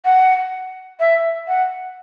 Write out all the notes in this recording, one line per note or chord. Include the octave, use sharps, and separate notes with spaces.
F#5
E5
F#5